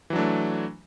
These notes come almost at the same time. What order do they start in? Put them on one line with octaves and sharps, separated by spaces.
E3 F#3 D4 A3